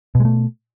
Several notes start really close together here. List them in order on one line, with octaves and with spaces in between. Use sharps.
B2 G#3 A3